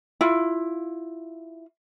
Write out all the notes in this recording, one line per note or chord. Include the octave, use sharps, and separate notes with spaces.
E4 F4